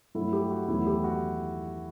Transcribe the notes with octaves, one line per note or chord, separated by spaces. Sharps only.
G2 F#3 A3 E4
G4
F#4
E2 D#3 F#3 A3 E4
G4
F#4